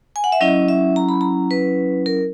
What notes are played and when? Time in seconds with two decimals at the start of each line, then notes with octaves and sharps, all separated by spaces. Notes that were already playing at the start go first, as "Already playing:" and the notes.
0.16 G#5
0.24 F#5
0.32 E5
0.41 F#3 C#4 E4 D#5
0.68 E5
0.96 A#5
1.09 B5
1.21 A#5
1.51 B4
2.06 A#4